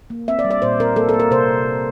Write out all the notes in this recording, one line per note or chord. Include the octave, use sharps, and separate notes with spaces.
A#3
C4 E5
D5
G3
D5
A#2 C5
C4 A#4
A#3 A4
A4
A#3
A#4
C3 C5